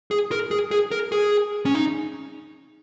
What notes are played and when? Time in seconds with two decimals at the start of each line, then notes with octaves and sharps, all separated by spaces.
0.11 G#4
0.31 A#4
0.51 G#4
0.71 G#4
0.91 A#4
1.12 G#4
1.66 C#4
1.75 D#4